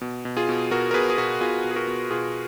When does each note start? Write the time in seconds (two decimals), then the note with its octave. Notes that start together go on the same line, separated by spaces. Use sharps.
0.01 B2
0.25 B2
0.37 F4 G#4
0.49 B2
0.71 B2 F#4 A#4
0.91 A#4
0.94 B2 G#4 B4
1.10 G#4
1.18 B2 F#4 A#4
1.41 B2 F4 G#4
1.64 B2
1.71 G#4
1.76 F#4 A#4
1.87 B2
2.10 B2 F4 G#4